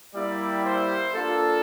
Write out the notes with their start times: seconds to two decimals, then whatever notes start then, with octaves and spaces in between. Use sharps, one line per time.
0.15 G3 A#3 E4 G4 D5
0.65 C5
1.15 A#3 D4 F4 A4